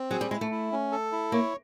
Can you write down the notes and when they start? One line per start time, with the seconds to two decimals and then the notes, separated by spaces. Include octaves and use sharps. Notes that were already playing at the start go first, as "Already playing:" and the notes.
Already playing: C4
0.11 F#3 G#4
0.21 G3
0.31 G#3 E4
0.41 A3
0.51 E4
0.72 C#4
0.92 A4
1.12 E4
1.32 A#3 C#5